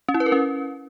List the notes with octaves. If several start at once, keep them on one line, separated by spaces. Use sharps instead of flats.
C#4
E4
B4
A#4
C#4